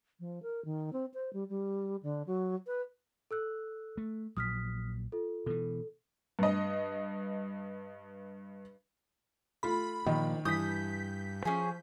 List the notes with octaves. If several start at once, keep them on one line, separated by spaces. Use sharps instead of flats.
F3
A#4
D#3
C4
C5
G3
G3
D3
F#3
B4
A4 E6 F#6
A3
A#1 F#3 D#6 F6 B6
F4 A4
B2 E3 A4
G2 D#5
A3 F4 B5
A#2 D#3 F3
G2 E3 D#6 G6 B6
F3 C#4 G#4